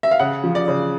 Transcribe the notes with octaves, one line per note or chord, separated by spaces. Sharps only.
E5
F5
C#3 F#5
F3
D5
C#3